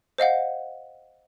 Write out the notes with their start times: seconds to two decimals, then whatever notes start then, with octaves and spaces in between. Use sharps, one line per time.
0.18 C5 D#5 F5 F#5